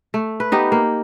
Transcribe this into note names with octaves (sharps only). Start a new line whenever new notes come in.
A3
B4
B3 D#4 G4
A#3